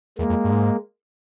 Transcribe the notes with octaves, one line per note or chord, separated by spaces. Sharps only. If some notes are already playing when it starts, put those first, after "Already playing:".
E2 G#3 A#3
F2
G2
G#2